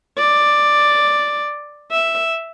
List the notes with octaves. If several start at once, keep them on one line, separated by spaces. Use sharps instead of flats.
D5
E5